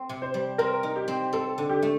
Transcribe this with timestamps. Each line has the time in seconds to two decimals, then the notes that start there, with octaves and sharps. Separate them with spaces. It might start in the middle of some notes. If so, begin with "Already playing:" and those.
Already playing: C4
0.09 C3
0.22 C5
0.34 G3
0.58 C4 A#4
0.83 D#4
0.96 G4
1.08 C4
1.33 C4 A4
1.58 D3
1.69 G4
1.82 A3